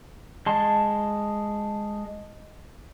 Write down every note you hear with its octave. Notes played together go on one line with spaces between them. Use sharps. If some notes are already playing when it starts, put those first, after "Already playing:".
G#3 A5 C6